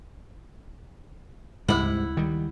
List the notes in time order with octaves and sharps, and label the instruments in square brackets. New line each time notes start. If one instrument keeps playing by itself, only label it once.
[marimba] D2 C#3 F6 [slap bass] G#2 G3 [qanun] E4 F#5
[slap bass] D#3 G3